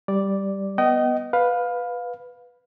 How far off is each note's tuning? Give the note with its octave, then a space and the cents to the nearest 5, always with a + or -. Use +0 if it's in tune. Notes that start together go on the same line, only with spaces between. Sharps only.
G3 +0 D5 +0
B3 -10 D#5 +0 G5 -45
B4 +0 F5 +20